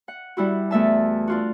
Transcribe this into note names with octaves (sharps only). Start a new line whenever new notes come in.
F#5
G3 E4 F#4
E2 A3 E5 A5
D4 F4 F#4